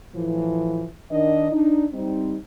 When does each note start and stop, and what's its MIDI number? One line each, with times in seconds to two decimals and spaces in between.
0.15 0.85 45
0.15 0.85 52
0.15 0.85 53
1.11 1.50 51
1.11 1.50 62
1.11 1.50 75
1.52 1.85 62
1.52 1.85 63
1.93 2.37 55
1.93 2.37 60
1.93 2.37 63